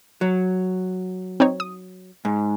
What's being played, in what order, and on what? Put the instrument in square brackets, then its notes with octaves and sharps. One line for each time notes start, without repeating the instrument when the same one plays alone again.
[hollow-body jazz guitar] F#3
[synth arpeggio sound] C4 D#4 C#5
D#6
[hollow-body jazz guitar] G#2